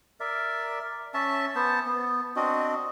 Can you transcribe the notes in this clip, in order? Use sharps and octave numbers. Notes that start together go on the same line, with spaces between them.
A#4 D5 E5
C#4 E5 A5
B3 C5 A5
B3
C4 D4 F#4 D#5